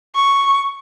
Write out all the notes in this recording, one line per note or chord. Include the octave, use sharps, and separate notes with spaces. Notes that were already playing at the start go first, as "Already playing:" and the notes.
C#6